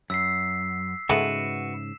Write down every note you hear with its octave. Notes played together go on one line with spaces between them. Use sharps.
F#2 E6 B6 C7
G#2 C#3 G#3 A3 B3 F#4 B4 E7